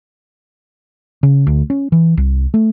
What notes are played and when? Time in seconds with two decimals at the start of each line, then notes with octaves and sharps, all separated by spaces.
1.23 C#3
1.47 D2
1.70 C#4
1.92 E3
2.17 C2
2.54 A3